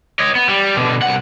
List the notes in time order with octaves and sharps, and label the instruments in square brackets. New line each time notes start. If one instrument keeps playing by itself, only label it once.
[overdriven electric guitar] C#5 D#5
B3
G3
B2 D3
C2 F#5